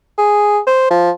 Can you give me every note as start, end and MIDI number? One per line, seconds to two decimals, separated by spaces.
0.18 0.60 68
0.67 0.88 72
0.90 1.11 53